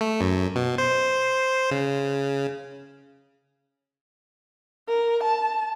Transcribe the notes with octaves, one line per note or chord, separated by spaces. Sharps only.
A3
F#2
B2
C5
C#3
A#4
A5